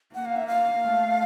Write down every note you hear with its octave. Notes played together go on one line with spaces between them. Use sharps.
A#3 F#5
F5
E5
F5
A3